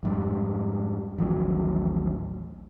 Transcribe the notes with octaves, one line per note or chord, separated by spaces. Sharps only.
F2 G#2 G3
A1 D#2 F3 F#3